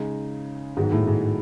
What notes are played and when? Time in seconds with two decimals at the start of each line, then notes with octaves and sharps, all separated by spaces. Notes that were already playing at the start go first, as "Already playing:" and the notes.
Already playing: C#3 G#3 D#4
0.77 G#2 D#3 F#3 B3 F#4
0.92 A2
1.07 G#2